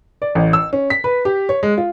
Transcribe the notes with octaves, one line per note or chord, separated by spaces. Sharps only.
D5
A1
E6
C#4
B6
B4
G4
C#5
G#3
F4